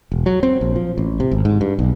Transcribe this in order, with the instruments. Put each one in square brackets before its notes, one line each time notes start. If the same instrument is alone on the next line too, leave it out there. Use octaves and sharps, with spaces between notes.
[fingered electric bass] E1
F#3
C4
A#1
F3
A1
C3
G#1
G#2
G2
B1